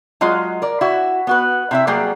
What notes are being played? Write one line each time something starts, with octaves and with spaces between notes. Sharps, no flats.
F#3 G#3 F4 D#5 F5
A#4 D5
E4 F#4
B3 F#4 B4
C3 E4 E5
F#3 G3 A#3 G4 G#4